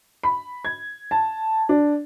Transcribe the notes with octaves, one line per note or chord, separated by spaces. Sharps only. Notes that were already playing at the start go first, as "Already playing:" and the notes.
B5
G#6
A5
D4